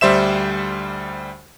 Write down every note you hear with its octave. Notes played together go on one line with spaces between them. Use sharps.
D2 G3 C5 E5 E7